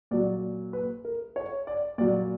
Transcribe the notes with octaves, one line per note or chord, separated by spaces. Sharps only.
A#2 F#3 D5
B4
A#4
C#5
D5
A#2 F#3 D5